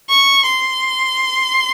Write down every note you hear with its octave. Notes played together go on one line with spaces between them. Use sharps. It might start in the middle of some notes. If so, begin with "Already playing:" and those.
C#6
C6